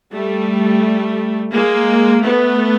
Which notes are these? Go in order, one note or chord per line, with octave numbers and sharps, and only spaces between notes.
G3 A3
G#3 A#3
A3 B3